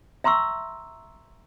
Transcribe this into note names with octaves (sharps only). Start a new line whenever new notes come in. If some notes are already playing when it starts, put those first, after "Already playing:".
E5 A#5 C6 C#6 E6